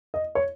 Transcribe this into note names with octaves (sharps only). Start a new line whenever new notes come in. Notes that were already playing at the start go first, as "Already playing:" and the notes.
D#5
C#5